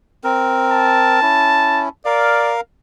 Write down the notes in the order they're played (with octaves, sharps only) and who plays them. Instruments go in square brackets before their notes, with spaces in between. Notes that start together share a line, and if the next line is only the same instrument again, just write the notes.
[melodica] C4 A#4
[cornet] A5
[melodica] C#4 E4
[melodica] A#4 F5 [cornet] D5